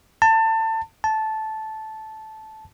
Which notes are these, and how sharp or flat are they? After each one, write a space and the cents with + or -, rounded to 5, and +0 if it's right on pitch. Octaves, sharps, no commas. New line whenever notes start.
A5 +25
A5 -10